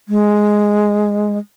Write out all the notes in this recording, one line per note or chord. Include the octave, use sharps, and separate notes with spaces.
G#3